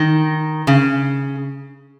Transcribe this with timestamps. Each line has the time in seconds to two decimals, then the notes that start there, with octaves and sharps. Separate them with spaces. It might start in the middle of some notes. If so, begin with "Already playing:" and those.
Already playing: D#3
0.67 C#3